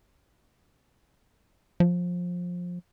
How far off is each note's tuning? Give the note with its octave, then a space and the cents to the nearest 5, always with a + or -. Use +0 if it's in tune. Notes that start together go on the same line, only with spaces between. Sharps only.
F3 +20